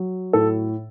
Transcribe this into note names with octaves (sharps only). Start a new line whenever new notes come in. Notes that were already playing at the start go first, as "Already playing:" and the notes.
Already playing: F#3
A2 A4